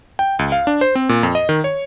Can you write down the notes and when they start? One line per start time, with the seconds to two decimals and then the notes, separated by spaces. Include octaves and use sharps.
0.19 G5
0.39 C#2
0.52 F5
0.67 D4
0.81 C5
0.95 C4
1.09 A#2
1.23 F2
1.35 D#5
1.49 D#3
1.64 C#5